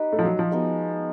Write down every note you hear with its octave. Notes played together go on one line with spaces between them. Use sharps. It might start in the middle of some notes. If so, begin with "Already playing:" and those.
Already playing: D#4 G4 B4
A3
F3
F#3
F3
G#3 B3 D#4 F#4